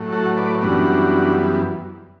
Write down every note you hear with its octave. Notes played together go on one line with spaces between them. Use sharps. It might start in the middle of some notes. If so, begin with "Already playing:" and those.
Already playing: A2 F#3 A3
F#4 A4
B4 D5
F#2 E3 G3 B3 D4 F#4